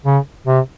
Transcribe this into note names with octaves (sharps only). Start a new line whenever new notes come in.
C#3
C3